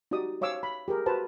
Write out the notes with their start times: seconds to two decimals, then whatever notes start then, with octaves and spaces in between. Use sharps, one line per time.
0.11 D#4 F#4 G4 D5 D#6
0.41 C5 C#5 F5 D6 E6
0.63 B5
0.88 G4 G#4 A#4
1.06 F#4 B4 C5 A5 B5